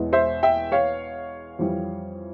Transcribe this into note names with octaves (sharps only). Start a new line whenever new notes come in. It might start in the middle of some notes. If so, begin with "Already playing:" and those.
Already playing: E1 E2 E3 G#3
C5 E5
E5 G5
C#5 F5
F2 E3 G3